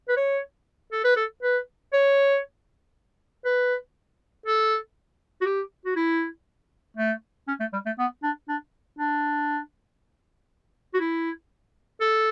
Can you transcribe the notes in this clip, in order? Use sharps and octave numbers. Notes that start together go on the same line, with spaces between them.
B4
C#5
A4
B4
A4
B4
C#5
B4
A4
F#4
G4
F#4
E4
A3
C#4
A3
G3
A3
B3
D4
D4
D4
F#4
E4
A4